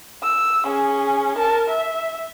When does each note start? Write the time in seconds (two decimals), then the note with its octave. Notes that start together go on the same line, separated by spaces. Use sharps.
0.23 E6
0.65 C#4 G#4
1.37 A#4 A5
1.68 E5